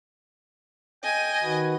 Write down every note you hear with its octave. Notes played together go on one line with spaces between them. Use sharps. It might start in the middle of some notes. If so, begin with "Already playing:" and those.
D#5 G5 G#5
D#3 F#4 B4